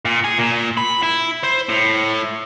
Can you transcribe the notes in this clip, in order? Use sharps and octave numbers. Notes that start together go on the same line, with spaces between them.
A#2
G#4
A#2
B5
E4
C5
A2